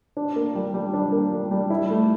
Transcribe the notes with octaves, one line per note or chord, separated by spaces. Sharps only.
D4
A#3
G3
G3
D4
A#3
G3
G3
E4
A3